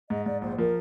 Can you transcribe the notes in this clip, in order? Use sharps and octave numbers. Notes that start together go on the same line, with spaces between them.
G#2 D#5
G#2 D5
A#1 C5
F3 A#4